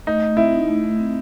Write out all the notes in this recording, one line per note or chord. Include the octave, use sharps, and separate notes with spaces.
A3 D#4
A3
C4 E4
D#4
A3
A3
C4